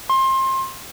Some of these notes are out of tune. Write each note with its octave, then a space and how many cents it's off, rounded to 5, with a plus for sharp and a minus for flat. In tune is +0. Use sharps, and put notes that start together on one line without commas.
C6 +25